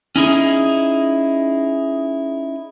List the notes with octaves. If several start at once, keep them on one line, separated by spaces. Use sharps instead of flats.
C#4 D#4 E4 G#4